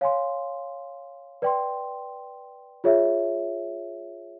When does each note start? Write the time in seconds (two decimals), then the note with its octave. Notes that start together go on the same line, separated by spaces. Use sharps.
0.01 C#5 F5 G#5 C6
1.42 B4 D5 G5 C6
2.84 F4 G#4 C#5 E5